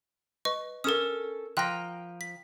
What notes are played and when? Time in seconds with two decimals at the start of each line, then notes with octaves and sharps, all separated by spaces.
0.45 B4 D#5 C#6
0.84 C#4 A4 A#4 D#6
1.57 F3 G5 A#5 F#6 A#6
2.21 B6